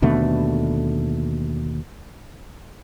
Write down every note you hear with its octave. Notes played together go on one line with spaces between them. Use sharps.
D#2 B2 D3 A3